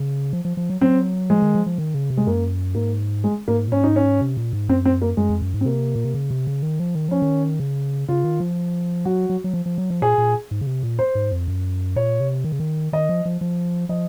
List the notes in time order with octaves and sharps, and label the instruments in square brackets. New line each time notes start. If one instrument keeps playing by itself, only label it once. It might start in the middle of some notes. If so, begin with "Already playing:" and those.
Already playing: [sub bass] C#3
F3
F3
F3
F#3
[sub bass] F#3 [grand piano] C4
[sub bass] F3 [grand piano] G#3
[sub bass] D#3
F3
F3
D#3
C#3
C3
[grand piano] G#3
[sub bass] F#2 [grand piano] A#3
[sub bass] G#2 [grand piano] A#3
[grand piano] G#3
[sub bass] G#2 [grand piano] A#3
[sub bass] A#2
[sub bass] G#2 [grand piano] C#4
[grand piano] D#4
C#4
[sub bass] C3
A#2
G#2
[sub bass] F#2 [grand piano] C4
[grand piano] C4
A#3
[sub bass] F#2 [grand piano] G#3
[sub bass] F2
F#2
G#2
[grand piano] C4
[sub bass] C3 [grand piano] A#3
[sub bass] A#2
C3
C#3
C3
C#3
D#3
F3
D#3
[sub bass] F3 [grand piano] C#4
[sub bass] D#3
C#3
[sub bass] C#3 [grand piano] F4
[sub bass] D#3
F3
[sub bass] F#3 [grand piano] F#4
[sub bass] F#3
F#3
F3
F3
F#3
F3
[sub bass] A#2 [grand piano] G#4
[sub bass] A#2
G#2
C#3
C3
A#2
[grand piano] C5
[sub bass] G#2
F2
F#2
[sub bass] A#2 [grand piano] C#5
[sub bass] C3
D#3
C#3
D#3
[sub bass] D#3 [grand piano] D#5
[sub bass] F3
F3
F3
[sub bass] F3 [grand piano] D#5